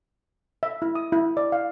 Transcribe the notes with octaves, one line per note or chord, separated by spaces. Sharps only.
E5
E4
D#6
E4
D5
F5